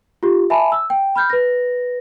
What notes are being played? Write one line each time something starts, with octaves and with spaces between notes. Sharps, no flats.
F4 G4
E5 G#5 A5 B5
E6
G5
B5 F6 G6
B4 A#6